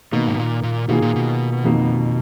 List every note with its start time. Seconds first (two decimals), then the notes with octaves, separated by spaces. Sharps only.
0.12 B2 D#3 A#3 D#4
0.27 G#2
0.38 A#2
0.63 A#2
0.88 B2 D#3 A#3 F4 G#4
1.02 A#2
1.16 B2
1.64 F2 D#3 A#3 D#4